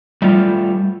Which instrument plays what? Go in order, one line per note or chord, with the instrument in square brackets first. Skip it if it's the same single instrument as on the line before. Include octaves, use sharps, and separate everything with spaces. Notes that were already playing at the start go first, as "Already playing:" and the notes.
[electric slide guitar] G3 A3 F4